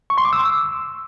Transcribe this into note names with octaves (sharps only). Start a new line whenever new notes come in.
C#6
C6
D6
E6